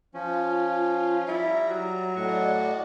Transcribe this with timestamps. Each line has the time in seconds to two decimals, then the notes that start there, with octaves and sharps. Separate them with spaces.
0.14 F3 C#4 F4
1.28 G3 E4 A#5
1.70 F#3
2.16 A2 F#4 D5 D#5 C#6